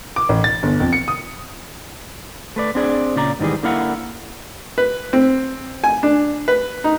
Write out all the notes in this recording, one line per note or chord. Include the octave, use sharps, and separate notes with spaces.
D6
A1
A6
G1
F2
C#7
D#6
A3 B4 D5
C4 D4 G#4 D5
A#2 C#3 D5 A#5
G#2 D#3 E3 G3 G#4
D3 A#3 E4 F5 F#5
B4
C4
G#5
D4
B4
D#4